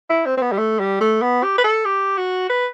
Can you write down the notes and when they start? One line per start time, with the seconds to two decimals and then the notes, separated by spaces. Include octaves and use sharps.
0.10 E4
0.26 C4
0.37 C4
0.42 B3
0.52 G3
0.58 A3
0.79 G3
1.01 A3
1.22 B3
1.43 G4
1.58 B4
1.64 A4
1.85 G4
2.17 F#4
2.49 B4